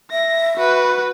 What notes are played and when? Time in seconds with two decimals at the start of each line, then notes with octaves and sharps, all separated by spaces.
0.12 E5 A#6
0.57 F#4 B4